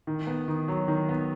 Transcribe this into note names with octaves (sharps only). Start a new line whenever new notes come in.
D#3
B3
D#3
F#3
D#3
B3